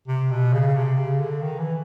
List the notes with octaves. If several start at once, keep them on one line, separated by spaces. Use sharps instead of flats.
C3
B2
C#3
C3
C#3
D3
D#3
E3